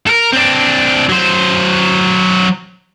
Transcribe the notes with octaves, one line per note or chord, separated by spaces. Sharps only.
A4 A#4
C4 D4
F#3 C5